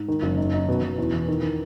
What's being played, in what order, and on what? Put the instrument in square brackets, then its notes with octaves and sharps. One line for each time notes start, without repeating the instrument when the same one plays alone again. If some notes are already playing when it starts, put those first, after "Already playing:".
Already playing: [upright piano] G#2
D#3
F#1
D#4
D#4
B2
B2
E2
E3
D#3
D#3